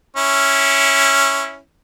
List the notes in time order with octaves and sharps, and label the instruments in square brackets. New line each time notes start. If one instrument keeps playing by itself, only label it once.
[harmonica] C#4 E4